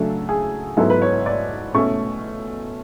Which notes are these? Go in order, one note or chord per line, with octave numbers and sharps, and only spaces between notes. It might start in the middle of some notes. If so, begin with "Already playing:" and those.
Already playing: C#3 F#3 A3 D4 A4
G#4
G#2 F#3 B3 E4 A4
B4
C#5
D5
B2 A3 C#4 C#6